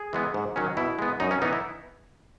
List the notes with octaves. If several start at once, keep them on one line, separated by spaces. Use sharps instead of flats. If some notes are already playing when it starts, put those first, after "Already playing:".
Already playing: G#4
E3 G#3 B3
G#2
D#3 F#3 C#4
B2 E4
G#3 B3
F#2 D#4
C#4
E3 B3 D#4
E4